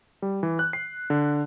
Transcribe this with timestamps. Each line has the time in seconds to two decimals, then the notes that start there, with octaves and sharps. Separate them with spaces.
0.22 G3
0.43 E3
0.59 F#6
0.73 C7
1.10 D3